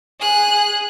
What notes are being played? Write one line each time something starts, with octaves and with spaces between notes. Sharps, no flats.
G#4 F#6